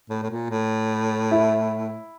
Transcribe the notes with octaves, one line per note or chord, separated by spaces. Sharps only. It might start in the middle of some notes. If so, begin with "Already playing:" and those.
A2
A2
A#2
A2
E4